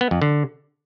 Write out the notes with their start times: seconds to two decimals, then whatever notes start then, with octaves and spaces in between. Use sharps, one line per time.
0.01 B3
0.11 F2
0.22 D3